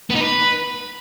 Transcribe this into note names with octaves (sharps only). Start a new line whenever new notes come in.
B3
D#4
B4